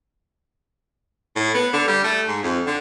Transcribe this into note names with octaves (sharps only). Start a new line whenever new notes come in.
A2
B3
D3
G3
A3
G#2
F2
D3